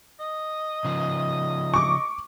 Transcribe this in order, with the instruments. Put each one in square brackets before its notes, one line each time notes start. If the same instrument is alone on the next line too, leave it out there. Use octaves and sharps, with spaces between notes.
[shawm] D#5
[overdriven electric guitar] C#3 F3
[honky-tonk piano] C#6 D6